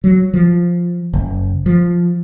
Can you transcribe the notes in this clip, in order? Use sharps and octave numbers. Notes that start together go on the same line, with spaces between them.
F#3
F3
F#1
F3